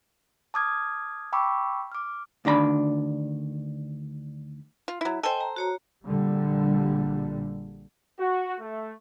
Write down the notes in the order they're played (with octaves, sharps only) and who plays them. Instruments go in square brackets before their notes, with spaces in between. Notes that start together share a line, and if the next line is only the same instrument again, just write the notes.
[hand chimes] A5 D6 D#6 F6 G#6
G5 A5 B5 C#6 D6 E6
D6 F6
[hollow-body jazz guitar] D2 D#3 D4 A#5 B5
[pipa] F4
F#3 E4
[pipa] A4 C5 [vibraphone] D#5 G5 G#5
[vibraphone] A#5
F#4 C#5 A#5
[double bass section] A#1 A#2 D3 G3
[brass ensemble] F#4
A3